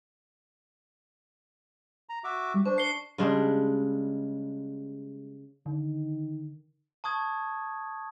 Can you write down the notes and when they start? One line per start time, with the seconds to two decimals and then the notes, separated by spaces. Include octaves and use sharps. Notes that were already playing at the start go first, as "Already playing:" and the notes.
2.09 A#5
2.24 F#4 E5 D6
2.54 G3
2.66 D4 C5 C#6
2.78 C7 C#7 G7
3.18 C#3 G3 G#3 D4
5.66 D3 D#3
7.04 A5 C#6 D#6 G#6